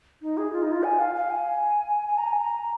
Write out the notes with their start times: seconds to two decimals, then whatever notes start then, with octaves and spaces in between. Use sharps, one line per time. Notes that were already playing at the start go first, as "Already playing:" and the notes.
0.22 D#4
0.37 G#4
0.52 F4
0.62 D#4
0.72 F4
0.83 G#5
0.99 F5
1.15 F5
1.30 G#5
2.07 G#5
2.18 A#5
2.28 G#5
2.39 A#5